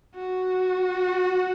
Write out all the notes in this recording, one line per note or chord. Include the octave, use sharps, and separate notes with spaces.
F#4